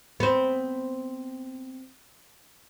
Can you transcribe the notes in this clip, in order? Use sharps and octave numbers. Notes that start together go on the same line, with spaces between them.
B3 C4